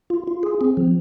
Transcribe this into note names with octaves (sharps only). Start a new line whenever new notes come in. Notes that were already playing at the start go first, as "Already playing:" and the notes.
F4
F4
G#4
C4
F3